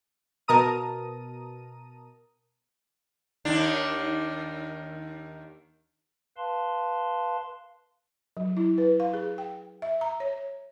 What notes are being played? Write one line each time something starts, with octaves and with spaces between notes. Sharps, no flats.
B2 A#4 A5 A#5 D#6 D#7
D#2 D#3 D4
B4 F5 A5 C6
F#3
E4
B4
F5
G#4
G5
E5
A#5
C#5